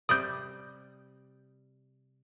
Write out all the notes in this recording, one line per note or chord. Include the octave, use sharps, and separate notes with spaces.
C3 G3 D5 D#6 G6